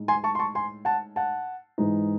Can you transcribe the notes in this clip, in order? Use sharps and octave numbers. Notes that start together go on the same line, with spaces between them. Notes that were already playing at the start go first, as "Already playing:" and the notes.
Already playing: A2 G#3 D#4
G#5 C6
A5 C#6
C6
A5 C#6
G#5 C6
F#5 A5
F#5 A5
G#2 E3 G#3 D#4